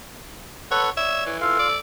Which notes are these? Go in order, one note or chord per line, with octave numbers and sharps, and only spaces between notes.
A4 B4 C#5 F#5
C#5 D5 E5
E3
F4 A4 F5
D5